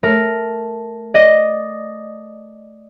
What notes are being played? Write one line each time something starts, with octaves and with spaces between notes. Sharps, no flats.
A3 A#4
D5 D#5